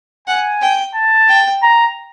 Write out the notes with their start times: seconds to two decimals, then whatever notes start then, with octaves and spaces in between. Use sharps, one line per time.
0.27 F#5 G#5
0.61 G5
0.95 A5
1.29 G5
1.63 A#5